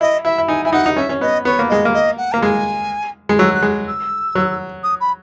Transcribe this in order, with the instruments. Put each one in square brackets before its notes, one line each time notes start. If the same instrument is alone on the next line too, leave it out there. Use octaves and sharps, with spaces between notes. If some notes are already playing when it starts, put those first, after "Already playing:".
[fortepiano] E4 [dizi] D#5
[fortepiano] E4 [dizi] E5
[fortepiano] E4
[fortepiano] D#4 [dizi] G#5
[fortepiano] E4 [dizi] G#5
[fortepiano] D#4 [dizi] F#5
[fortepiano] D#4
[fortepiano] C#4 [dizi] E5
[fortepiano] C#4
[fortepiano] B3 [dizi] D#5
[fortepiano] B3 [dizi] C#5
[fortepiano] A#3
[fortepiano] G#3 [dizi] D#5
[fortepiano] A#3
[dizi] D#5
F#5
[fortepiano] A#3 [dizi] A#5
[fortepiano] G#3 [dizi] G#5
[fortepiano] G#3
[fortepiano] F#3 [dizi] E6
[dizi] F#6
[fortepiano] G#3
[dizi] E6
[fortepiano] F#3
[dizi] D#6
B5